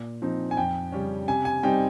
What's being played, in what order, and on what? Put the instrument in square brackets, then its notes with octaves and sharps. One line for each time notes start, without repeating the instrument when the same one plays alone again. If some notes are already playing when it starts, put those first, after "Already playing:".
Already playing: [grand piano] A#2
F3 C4 D#4
G#5
F2 G5
C#3 G3 C#4
C3 G#5
G#5
G3 C4 D#4 G5